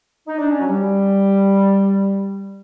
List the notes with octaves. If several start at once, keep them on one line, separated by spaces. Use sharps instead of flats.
D#4
D4
C#4
F#3
G3